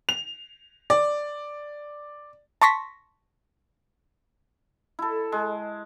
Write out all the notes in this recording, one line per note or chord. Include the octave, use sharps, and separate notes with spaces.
F7
D5
A5 C6 C#6 A#6 B6
E4 A4
G#3